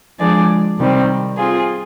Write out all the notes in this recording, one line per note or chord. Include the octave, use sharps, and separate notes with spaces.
F3 G#3 D4 G#4 D5
C3 D#3 G3 C4
C4 F4 G#4